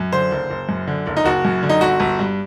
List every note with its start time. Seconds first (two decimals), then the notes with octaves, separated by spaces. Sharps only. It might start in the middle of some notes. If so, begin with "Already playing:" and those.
Already playing: F#2
0.13 D3 C5
0.32 F#1
0.50 F#1
0.69 F#2
0.87 D3
1.07 F#1
1.17 D#4
1.25 F#1 F#4
1.45 F#2
1.63 D3
1.69 D#4
1.81 G1 F#4
2.00 G1
2.19 G2